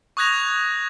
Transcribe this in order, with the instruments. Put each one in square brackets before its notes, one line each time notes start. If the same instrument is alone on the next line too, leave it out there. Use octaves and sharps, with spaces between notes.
[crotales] C#6 D#6 F#6 G#6 A#6 F7